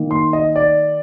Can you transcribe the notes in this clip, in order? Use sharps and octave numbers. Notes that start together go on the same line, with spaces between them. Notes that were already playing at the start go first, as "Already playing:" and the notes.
Already playing: D#3 A#3 D#4
C6
D#5
D5